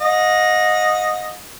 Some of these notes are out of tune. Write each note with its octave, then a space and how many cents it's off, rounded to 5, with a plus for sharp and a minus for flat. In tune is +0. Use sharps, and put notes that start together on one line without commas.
D#5 +0 F#5 -40